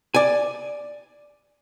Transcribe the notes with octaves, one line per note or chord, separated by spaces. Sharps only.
D5 G#5